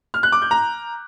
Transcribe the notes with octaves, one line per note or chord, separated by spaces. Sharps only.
F6
F#6
D6
G6
A#5